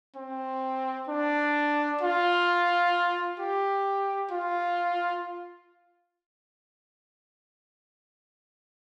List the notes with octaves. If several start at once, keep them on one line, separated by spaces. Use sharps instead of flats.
C4
D4
F4
G4
F4